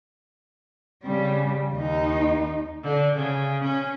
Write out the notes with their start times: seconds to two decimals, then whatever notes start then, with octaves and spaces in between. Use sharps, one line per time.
1.03 C#3 G3
1.75 D#2 D#4
2.84 D3
3.15 C#3
3.64 C#4